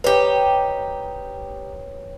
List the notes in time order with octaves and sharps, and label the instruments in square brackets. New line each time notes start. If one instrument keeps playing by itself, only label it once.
[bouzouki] D#4 G4 [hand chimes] B4 C#5